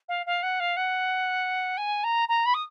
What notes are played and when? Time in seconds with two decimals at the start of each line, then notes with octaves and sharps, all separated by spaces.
0.09 F5
0.26 F5
0.43 F#5
0.60 F5
0.77 F#5
1.77 G#5
2.04 A#5
2.28 A#5
2.46 B5
2.54 D#6